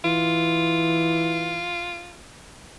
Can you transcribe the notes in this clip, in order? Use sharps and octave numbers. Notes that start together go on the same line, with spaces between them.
E3 F4